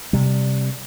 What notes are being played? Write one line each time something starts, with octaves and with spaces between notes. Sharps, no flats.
C3 G3